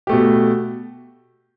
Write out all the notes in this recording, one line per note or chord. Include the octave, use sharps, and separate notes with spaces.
B2 A3 G4